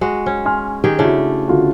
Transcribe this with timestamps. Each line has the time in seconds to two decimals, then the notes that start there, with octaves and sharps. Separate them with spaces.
0.01 G#3 F#4
0.26 C#4
0.46 G#5 C6 F6
0.84 D#3 G4 G#4
0.99 C#3 A3 D4 E4 F#4
1.48 D3 F4 F#4